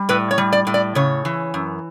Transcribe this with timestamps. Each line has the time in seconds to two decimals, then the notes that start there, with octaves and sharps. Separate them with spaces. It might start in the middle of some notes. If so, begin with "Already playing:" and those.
Already playing: G3
0.09 A2 B4
0.31 C#5
0.38 G3
0.53 D5
0.67 A2
0.74 D5
0.95 C#3 C#5
1.25 E3
1.54 F#2